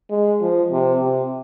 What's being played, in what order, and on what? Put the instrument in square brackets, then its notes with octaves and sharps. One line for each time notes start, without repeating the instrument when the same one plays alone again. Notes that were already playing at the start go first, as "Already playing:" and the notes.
[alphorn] G#3
F3
C3
C3